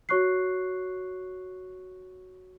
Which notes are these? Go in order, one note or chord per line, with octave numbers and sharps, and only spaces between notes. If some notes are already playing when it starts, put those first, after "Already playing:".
F#4 C#5 C#6 F#6 C7